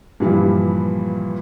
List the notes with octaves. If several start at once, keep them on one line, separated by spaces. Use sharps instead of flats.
G2 A#2 E3 F3 G3